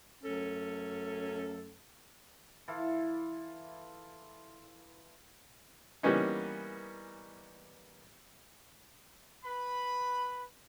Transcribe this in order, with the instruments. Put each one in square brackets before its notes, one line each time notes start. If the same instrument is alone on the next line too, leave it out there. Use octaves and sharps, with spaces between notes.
[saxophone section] F#2 A3 C#4 A4
[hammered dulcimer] E3 F4 A4
[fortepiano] E3 G3 A#3 B3 C#4 D#4
[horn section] B4 B5